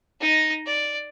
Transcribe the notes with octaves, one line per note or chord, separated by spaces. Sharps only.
D#4 D#5
D5